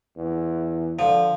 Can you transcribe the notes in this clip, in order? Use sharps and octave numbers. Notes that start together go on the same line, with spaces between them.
E2
D3 F3